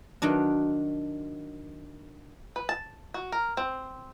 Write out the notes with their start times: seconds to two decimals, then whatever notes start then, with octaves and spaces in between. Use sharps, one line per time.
0.22 D#3 F#3 D4
2.56 B4
2.69 A5
3.14 F#4
3.32 A#4
3.57 C4